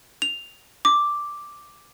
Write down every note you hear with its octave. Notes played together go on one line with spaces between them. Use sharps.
F7
D6